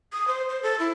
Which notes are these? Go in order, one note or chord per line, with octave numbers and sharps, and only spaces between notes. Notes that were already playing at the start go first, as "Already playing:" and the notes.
D#6
C5
C5
A4
E4